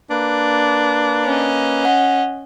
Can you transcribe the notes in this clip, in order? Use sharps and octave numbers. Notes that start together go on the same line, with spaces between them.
A#3 D4 B4
C#4 D#5
F#5